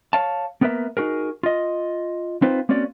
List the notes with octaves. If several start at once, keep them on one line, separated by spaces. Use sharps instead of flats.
C#5 F5 A5
A#3 B3 A#4 B4 E5 A#5
D#4 F#4 G#4 A#4
F4 D#5
C4 D#4 F4 B4 C5
A#3 C4 C#4 F#4 D5